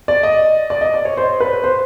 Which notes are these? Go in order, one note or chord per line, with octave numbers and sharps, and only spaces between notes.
D5
D#5
D5
D#5
D5
C#5
C5
B4
C5